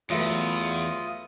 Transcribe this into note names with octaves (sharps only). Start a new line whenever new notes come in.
E2 F#3 A3 B3 F4 D#6